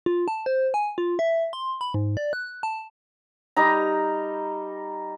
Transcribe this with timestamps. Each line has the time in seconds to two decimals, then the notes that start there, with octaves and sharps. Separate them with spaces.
0.06 F4
0.28 A5
0.46 C5
0.74 G#5
0.98 F4
1.19 E5
1.53 C6
1.81 B5
1.94 G#2
2.17 D5
2.33 F#6
2.63 A5
3.56 G3 D#4 A#5